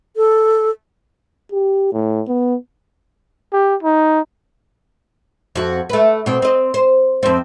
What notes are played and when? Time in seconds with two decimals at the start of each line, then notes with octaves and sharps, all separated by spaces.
0.16 A4
1.52 G4
1.93 A2
2.28 B3
3.53 G4
3.83 D#4
5.55 F2 F#4
5.89 A3 B4
6.26 B2 C4
6.42 C4 D#5
6.74 C5
7.23 F2 C4